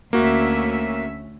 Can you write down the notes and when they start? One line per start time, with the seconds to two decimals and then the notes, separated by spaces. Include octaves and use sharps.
0.13 D2 A#3 C#4 F#4 E5